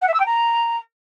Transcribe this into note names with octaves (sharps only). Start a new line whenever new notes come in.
F#5
E5
E6
G5
A#5